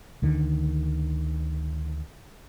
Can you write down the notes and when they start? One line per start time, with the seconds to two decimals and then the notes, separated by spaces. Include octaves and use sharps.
0.22 D2 D3 D#3